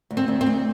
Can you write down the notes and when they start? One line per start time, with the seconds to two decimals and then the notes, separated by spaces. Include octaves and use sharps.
0.11 D2
0.17 C4
0.28 D2
0.41 C4
0.46 D2